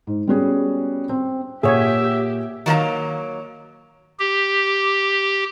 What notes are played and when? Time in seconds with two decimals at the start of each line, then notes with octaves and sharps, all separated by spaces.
0.07 G#2
0.27 G3 B3 C#4 F#4 G#4
1.09 C4
1.63 A#2 G4 G#4 C#5 E5 F#5 G#6
2.66 D#3 F#3 A#3 B4 F5 A#5
4.19 G4